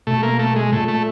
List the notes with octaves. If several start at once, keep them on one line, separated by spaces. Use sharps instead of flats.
B2 A3
A#3
A3
G#3
A#2 A3
A3